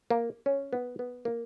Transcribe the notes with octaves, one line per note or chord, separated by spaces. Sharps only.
A#3
C#4
B3
B3
A#3